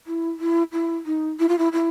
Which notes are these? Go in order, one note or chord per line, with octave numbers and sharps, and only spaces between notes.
E4
E4
E4
D#4
E4
F4
E4
E4